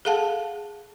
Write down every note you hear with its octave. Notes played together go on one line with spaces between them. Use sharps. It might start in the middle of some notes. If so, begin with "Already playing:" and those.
G#4 A4 F5 F#5 A5